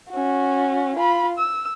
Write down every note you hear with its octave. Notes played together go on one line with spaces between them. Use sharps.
C#4 F#4
F4 B5
E6